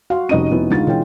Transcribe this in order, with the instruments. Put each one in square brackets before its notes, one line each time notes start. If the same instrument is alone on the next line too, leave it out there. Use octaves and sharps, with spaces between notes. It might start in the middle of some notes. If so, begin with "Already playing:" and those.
[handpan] F#4 [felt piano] F5 C6
[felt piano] F1 D#5 D#7 [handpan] C#4 D#4
[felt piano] F1 B3 E4
[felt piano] D2 A6 [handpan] G#3 D#4 F4
[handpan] B2 [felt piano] E3 C#4 G5